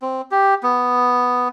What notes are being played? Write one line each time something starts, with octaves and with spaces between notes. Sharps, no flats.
C4
G4
B3